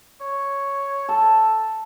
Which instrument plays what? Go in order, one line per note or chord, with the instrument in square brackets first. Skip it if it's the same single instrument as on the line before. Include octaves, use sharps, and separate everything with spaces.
[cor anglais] C#5
[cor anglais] A4 [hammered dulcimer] A5